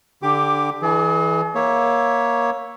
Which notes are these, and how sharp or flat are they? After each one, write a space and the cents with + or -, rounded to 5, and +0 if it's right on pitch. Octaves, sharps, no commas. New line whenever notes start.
D3 +0 G4 +15 D6 +0
E3 +0 G#4 +45 D5 +30
A#3 +15 C#5 +0 E5 +0